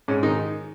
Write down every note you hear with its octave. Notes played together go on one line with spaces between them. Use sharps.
G#2 C#4
D#3 D#4